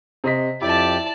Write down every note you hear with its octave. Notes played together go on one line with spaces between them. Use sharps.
C3 D#5 B6
F2 E4 G4 D5 A5 D6